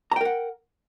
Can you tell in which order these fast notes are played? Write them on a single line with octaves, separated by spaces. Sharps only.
A#5 G5 A#4 F#5